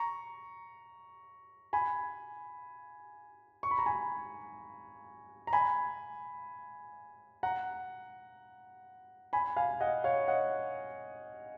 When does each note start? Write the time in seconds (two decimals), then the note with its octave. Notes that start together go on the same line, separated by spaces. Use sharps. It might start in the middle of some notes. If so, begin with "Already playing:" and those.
Already playing: A#5 C#6
1.73 G#5 B5
3.63 C#6
3.71 B5
3.78 A#5
3.86 G#5 B5
5.47 A#5
5.53 G#5 B5
7.43 F#5 A#5
9.33 G#5 B5
9.56 F5 G#5
9.81 D#5 F#5
10.04 C#5 F5
10.28 D#5 F#5